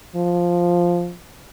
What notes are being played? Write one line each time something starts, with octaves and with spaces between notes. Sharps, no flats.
F3